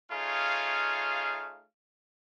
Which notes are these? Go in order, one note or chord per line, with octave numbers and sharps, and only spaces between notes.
A3 D#4 F4 G#4 C#5 F5